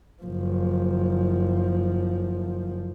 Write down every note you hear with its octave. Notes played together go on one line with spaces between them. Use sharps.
F#1 F3